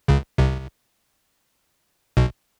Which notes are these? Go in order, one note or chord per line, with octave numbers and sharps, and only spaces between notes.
C#2 C#3
C2 C3
B1 B2